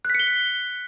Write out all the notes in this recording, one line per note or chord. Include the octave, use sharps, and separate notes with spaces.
F#6 B6 C#7 G7